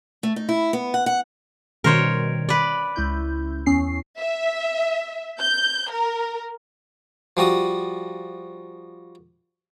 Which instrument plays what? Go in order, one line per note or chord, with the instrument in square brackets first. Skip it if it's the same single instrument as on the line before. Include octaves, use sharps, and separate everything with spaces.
[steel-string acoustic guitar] A3
D#4
E4
B3
F#5
F#5
[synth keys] B2 D#3 G3 [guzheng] A#4 C5 C#5
[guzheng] B4 D5
[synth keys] C#2 E4 G6
E2 C#4 C7
[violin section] E5
G6
A#4
[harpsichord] F3 G3 F#4 D#6